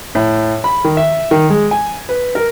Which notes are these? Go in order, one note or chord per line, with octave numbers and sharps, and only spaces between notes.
A2
B5
D#3
E5
D#3
G#3
G#5
B4
A#4